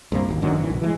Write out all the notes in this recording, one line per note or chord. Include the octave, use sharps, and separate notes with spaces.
C2 G2 C3 A#3
G#1 D#2
F#2 D3 D#3 F#3
F1 G#2 E3
B1
E3 F#3 G#3